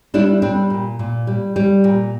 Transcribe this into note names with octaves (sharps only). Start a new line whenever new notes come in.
G3 D4 E4
G3 C4 D4
A#2
A#2
G3
G3
A#2